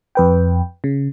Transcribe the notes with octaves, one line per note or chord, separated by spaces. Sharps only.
F2 B4 G5
C#3